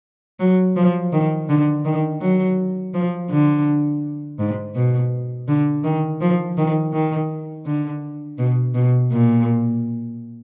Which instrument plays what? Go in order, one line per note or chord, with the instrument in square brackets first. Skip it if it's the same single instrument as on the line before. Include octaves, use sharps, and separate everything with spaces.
[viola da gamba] F#3
F3
D#3
D3
D#3
F#3
F3
D3
G#2
B2
D3
D#3
F3
D#3
D#3
D3
B2
B2
A#2